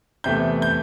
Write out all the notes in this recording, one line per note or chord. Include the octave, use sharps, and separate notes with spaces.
E2 C3 E3 A3 G6
G6